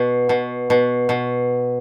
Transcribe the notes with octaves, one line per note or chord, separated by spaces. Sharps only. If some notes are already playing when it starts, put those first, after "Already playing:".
Already playing: B2
B2
B2
B2